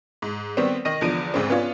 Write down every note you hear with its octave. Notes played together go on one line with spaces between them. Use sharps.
G#2
D#3 G3 B3 C4
D#3 D#5 A#6 D#7
E2 D3 F3 D7 D#7
D2 G#2 C#3 C4
B3 C#4 D4 F4